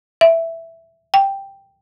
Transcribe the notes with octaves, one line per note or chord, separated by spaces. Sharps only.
E5
G5